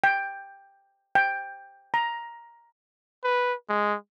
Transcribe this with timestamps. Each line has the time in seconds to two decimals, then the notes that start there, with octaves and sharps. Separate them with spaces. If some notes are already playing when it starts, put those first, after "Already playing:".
0.04 G5
1.15 G5
1.94 A#5
3.24 B4
3.69 G#3